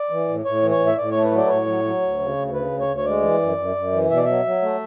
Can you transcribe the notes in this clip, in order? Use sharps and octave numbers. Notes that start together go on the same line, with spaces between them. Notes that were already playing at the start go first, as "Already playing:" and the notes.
Already playing: D5
E3
A2
A2 C#5
E3
C#5
A2
E5
A2 D5
A3 C#5
B4
F#3
D5
B4
A2 C#5
F#3
F#3
D2
C#3
D2
C#3 B4
D2
C#5
D2
C#5
G#3 D5
E3
F#2
F#2
F#2
E3
B2 E5
D5
F#3 E5
F#3
A3